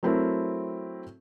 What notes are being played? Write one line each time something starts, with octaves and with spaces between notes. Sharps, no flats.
F#3 A3 C4 E4 A4 A#4